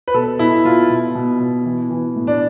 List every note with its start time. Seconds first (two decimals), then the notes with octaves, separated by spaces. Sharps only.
0.08 B4
0.14 B2 A4
0.39 B2 E4
0.65 B2 F4
0.90 B2
1.15 B2
1.40 B2
1.65 E3
1.90 E3
2.16 A2
2.27 D4